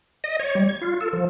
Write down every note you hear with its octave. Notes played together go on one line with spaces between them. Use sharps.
D#5
C#5
G3
G#6
F4
A4
F3